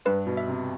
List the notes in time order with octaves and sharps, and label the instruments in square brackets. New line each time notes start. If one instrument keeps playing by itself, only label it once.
[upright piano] G2 [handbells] B4
[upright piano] B2
[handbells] E5
[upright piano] C3